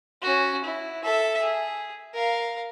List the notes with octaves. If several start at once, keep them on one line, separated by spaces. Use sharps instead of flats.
C#4 F#4
E4
A4 E5
G#4
A#4 F5